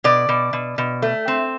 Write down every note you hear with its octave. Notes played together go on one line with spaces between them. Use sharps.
B2 D5
B2
B2
B2
A3
C4